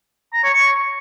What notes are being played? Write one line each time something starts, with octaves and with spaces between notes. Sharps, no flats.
A#5
C#5
C#6